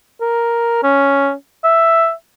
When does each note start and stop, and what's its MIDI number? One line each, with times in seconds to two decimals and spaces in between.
0.21 0.79 70
0.84 1.33 61
1.64 2.12 76